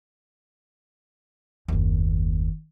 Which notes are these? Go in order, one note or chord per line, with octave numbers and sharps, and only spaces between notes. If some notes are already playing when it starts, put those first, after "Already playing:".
F#1 D#2